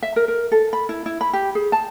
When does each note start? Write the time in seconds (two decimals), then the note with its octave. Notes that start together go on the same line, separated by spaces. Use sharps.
0.03 E5
0.16 A#4
0.28 A#4
0.52 A4
0.73 B5
0.89 E4
1.06 E4
1.21 B5
1.33 G4
1.55 G#4
1.72 A5